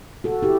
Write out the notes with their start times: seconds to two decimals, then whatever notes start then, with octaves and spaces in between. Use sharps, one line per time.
0.24 F#4 A4
0.43 E4 G4